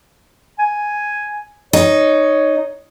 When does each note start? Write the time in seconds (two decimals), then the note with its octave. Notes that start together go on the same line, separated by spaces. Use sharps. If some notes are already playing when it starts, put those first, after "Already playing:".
0.59 G#5
1.73 D#4 C#5